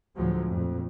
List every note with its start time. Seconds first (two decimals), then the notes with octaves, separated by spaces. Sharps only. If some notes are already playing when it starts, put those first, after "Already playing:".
0.16 D2 A2 F3 F#3 G#3
0.51 F2 A#2